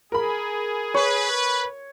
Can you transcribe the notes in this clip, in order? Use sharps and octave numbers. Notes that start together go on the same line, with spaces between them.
G#4 A#4 B5
B4 C#5